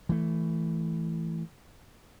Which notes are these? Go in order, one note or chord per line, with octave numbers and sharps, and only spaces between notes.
E3 A3